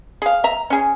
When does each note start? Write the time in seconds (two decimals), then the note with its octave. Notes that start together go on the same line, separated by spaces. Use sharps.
0.22 G#4 F5
0.44 E5 A#5
0.70 C#4 G#4